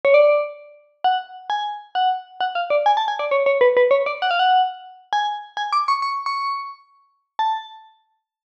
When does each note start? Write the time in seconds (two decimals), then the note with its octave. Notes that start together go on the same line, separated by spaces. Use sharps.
0.05 C#5
0.14 D5
1.04 F#5
1.50 G#5
1.95 F#5
2.41 F#5
2.55 F5
2.70 D5
2.86 G#5
2.97 A5
3.08 G#5
3.19 D5
3.31 C#5
3.46 C#5
3.61 B4
3.77 B4
3.91 C#5
4.06 D5
4.22 F#5
4.31 F5
4.39 F#5
5.13 G#5
5.57 G#5
5.73 D6
5.88 C#6
6.02 C#6
6.26 C#6
7.39 A5